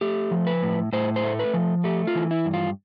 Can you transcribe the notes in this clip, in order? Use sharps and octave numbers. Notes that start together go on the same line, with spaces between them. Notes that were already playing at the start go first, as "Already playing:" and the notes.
A3 G4
F3
B4
A2
A2 C5
C5
A3
B4
F3
A3 G4
F4
E3
E4
G2
F4